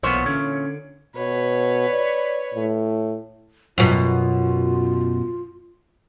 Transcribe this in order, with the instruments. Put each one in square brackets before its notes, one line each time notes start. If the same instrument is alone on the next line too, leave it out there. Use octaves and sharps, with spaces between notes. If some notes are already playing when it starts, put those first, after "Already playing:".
[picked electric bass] B1 [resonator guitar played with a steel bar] A#2 E3 C#5 [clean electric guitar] B3 C5
[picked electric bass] D3 [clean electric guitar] C#4
[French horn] B2 [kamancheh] B4 C#5
[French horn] D5
A2
[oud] F#2 B2 [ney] F4